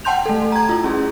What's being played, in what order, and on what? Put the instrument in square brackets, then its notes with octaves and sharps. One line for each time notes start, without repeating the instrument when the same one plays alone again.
[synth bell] F#5 G5 A5 C6 G6 F7
A3 A4
A#5 G#6
E4 F4
C#4 G#4